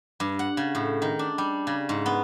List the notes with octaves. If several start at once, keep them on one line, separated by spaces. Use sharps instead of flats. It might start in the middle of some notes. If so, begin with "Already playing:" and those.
G2
F#5
C#3
A2
D#3
D4
G3
C#3
G#2
B3